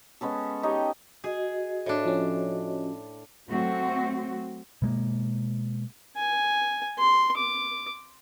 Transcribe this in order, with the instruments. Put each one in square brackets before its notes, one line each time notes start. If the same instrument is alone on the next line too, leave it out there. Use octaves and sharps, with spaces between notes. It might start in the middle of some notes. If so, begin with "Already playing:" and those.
[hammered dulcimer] G#3 B3 C#4 A4
D#4 G4 C#5 D#5
[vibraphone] F#4 D#5 [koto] G#4
[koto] A2 D4
[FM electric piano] F3 C#4
[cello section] F#3 A3 C4 F#4
[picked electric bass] B2 G#3 A#3
[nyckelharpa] G#5
C6
D6